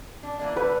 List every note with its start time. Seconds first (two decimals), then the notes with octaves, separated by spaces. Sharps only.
0.23 D4
0.39 E3 A#3 D4
0.56 D3 G3 B4